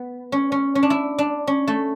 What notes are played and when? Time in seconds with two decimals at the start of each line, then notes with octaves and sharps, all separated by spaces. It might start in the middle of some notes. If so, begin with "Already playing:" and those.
Already playing: B3
0.32 C#4
0.52 C#4
0.75 C#4
0.83 D4
0.90 E4
1.18 D4
1.47 C#4
1.67 A3